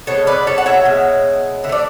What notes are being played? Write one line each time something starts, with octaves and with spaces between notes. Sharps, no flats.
B2 G#3 A4 C#5
B4 D5
A4 C#5
F#5
C#5 E5
B2 G#3
D3 E5
A3 D5